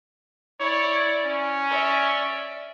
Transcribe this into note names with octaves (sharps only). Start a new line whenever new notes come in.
E4 C#5 D5
C#4
D5 E5